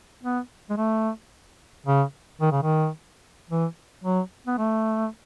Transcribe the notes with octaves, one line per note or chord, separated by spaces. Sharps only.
B3
G#3
A3
C#3
D#3
C#3
D#3
E3
F#3
B3
A3